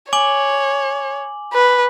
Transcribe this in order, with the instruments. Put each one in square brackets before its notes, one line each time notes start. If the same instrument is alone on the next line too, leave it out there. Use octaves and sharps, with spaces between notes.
[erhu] C#5 [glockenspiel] G#5 D6 F#7
[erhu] B4